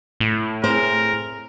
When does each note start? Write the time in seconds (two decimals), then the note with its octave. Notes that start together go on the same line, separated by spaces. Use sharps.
0.20 A2
0.64 C4 G#4 A#4 C5